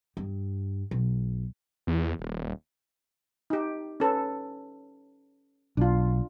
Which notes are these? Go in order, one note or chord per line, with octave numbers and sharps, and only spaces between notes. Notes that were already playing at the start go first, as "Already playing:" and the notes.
G2
B1
E2
D#1
D#4 G4
C#4 A4 B4
B1 D4 F4